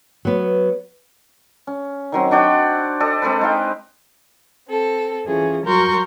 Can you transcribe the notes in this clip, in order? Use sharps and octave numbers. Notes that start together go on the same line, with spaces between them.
F#3 B3
C#4
D#3 F#3 C4
D4 F#4 D5 G5
G4 A4 D5 D#5
G#3 C4 A4 B4
G#3 D#4 F5 G5
C4 A4
E3 C#4 F4 G#4
F#3 F#4 A#4 C6 C#6 G6